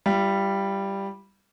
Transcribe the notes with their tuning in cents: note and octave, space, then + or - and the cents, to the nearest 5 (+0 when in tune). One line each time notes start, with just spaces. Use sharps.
G3 +0 F4 -45